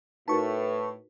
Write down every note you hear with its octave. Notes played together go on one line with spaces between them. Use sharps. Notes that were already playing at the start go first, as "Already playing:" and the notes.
A2 D#4 F#4 A#4 B4 A5 C#6